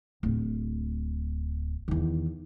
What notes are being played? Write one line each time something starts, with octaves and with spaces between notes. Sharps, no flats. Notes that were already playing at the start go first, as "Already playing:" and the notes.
D1
E2 D#3